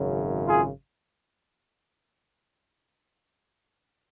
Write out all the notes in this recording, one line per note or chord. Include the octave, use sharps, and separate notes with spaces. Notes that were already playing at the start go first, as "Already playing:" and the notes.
Already playing: G#1 F#2 C#3
F4 G#4